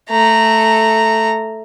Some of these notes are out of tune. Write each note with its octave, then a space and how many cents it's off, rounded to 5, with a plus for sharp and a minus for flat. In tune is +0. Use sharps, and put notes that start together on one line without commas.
A3 +0 A#5 -15